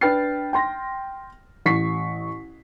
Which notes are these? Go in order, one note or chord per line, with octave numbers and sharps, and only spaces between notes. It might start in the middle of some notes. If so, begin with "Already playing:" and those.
D4 B4 G5 F6 A6 C7
G5 C6 A#6
A1 C#6 B6 C7